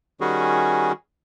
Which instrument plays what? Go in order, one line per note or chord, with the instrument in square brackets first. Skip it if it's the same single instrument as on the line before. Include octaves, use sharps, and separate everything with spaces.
[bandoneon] D#3 G3 C#4 F#4 G#4